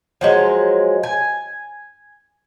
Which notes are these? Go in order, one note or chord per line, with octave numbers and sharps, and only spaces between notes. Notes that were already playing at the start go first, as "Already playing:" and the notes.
F3 F#3 G#3
G#5